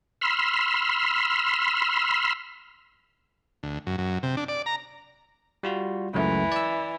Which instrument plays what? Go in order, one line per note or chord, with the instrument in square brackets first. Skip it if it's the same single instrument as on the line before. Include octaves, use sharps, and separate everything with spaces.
[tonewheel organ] B5 C6 E6 F6
[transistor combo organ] D2
F#2
F#2
C3
D4
D5
A#5
[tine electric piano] G3 F4 F#4
[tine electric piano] C#2 F#2 A3 [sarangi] E3
[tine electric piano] D5 E6